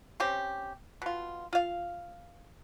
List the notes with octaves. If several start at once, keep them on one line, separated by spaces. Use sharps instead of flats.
C4 C#4 G4
B2 F4
F4 F5